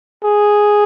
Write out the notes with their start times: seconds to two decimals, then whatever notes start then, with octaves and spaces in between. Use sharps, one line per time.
0.25 G#4